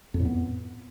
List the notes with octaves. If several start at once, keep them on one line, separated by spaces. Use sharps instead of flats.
F2
A2
B3